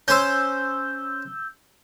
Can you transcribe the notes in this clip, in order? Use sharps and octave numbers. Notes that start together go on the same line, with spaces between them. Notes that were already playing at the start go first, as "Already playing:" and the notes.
C#4 C5 E6 G6